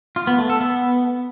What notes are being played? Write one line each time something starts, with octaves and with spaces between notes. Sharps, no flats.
F4
B3
A3
A4
B3